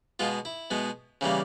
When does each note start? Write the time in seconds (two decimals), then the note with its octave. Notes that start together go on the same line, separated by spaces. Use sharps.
0.19 B2 G#3 B3 F4
0.45 E4
0.71 B2 G#3 B3
1.21 C#3 E3 G3 A#3